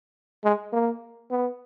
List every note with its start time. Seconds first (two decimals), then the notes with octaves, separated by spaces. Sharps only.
0.44 G#3
0.73 A#3
1.31 B3